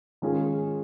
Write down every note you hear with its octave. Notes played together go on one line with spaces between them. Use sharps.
D#3 G#3 C#4 F4 G#4